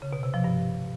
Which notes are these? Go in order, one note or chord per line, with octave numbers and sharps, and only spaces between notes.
C#3
B2
C3
F3
G2